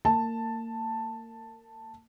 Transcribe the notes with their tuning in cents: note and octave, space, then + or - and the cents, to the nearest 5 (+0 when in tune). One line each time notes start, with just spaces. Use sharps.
A#3 -30 A5 +5